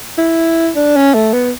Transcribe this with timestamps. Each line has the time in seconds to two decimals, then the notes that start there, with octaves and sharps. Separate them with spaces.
0.18 E4
0.76 D4
0.96 C#4
1.14 A3
1.33 B3